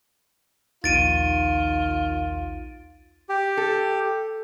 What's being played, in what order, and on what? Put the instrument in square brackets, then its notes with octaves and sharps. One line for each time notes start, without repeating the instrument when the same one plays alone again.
[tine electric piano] A#1 D#2 [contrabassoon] D#3 [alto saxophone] F4 [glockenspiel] A6 D7 D#7
[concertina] G4
[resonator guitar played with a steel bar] A4